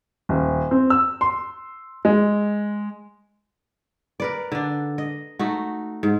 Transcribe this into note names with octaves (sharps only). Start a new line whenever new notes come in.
D#1
C4
E6
C6
G#3
A#4 B4 D5
D3 D4
D#5
A3 D#4 F#4
G#2